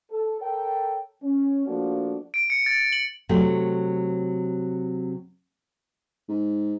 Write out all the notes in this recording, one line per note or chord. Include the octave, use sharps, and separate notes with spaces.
A4
A4 A#4 C#5 G5
C#4
F3 A3 A#3 D4 F#4
D7
C#7
A6
F#7
C3 F#3 A3
G#2